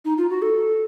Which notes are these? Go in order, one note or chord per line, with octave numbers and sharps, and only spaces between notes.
D#4
F4
F#4
A4